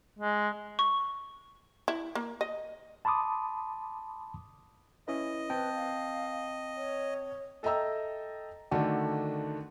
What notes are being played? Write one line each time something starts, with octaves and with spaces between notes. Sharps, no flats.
G#3
C#6
E4
A#3
D#5
A5 B5 C6 D6 D#6
C#4 E4 B4 D#5
C4 B4 G5 A5
F5
C#5
A4 D#5 E5 G5 A#5 E6
D3 D#3 A3 D4 F#4